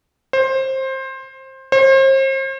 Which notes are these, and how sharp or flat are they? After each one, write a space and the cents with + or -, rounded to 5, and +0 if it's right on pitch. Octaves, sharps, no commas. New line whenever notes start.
C5 +20
C5 +40